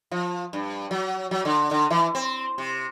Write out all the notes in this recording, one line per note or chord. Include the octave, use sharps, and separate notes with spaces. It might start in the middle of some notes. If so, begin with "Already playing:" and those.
F3
G2
F#3
F#3
D3
D3
E3
C4
C3